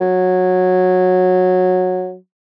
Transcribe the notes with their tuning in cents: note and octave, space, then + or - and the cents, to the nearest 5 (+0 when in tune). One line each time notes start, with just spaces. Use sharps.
F#3 -15